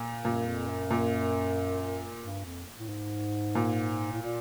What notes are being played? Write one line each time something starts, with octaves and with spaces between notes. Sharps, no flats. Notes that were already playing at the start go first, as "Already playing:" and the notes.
Already playing: A#2
F#2 A#2
F2
F#2
A#2
G2
F2
A2
G#2
A#2
A2
A#2